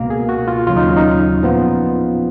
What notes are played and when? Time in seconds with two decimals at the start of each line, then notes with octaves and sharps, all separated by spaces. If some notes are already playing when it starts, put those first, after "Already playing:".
Already playing: C#2 B2 A#3 F#4 A#4
0.10 G#4
0.29 F#4
0.48 F4
0.67 D#2 C#3 F#3 F4
0.77 D#4
0.87 C#4
0.96 D#4
1.43 A#2 F3 B3 F4